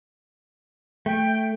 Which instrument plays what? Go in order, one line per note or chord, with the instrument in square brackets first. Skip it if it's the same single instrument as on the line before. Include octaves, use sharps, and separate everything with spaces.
[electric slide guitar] A3 [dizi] G5